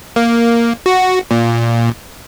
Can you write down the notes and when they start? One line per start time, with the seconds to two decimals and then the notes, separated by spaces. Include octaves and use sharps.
0.16 A#3
0.86 F#4
1.31 A#2